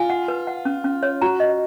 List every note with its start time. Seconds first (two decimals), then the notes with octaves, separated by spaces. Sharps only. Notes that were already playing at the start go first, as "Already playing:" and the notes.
Already playing: F4 G#5
0.10 F#5
0.28 B4
0.47 F#5
0.65 C#4
0.84 C#4
1.03 C#5
1.22 F#4 A#5
1.40 D#5